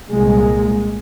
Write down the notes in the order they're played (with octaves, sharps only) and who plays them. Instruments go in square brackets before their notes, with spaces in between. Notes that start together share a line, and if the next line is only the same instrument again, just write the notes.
[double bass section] C2 A#2 G#3